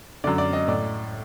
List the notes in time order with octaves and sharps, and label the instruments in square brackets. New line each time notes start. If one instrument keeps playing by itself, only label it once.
[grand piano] D3 D5
F#2
D5
D#5
A2 D5